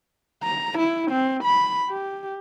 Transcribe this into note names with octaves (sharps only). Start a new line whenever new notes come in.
A#5
E4
C4
B5
G4